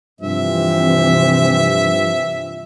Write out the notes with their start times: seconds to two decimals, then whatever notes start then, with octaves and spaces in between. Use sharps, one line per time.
0.21 G2 C3 E3 F3 C4 E5